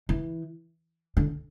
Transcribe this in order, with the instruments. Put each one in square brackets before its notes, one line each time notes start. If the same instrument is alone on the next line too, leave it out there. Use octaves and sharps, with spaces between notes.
[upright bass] E3
D3